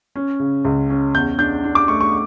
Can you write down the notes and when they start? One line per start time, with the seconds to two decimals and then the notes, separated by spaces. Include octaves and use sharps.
0.16 C#4
0.40 C#3
0.65 C#2
0.90 C#4
1.14 E2 G6
1.38 D4 G6
1.64 D4
1.75 D6
1.88 A3 C#6
2.01 C#6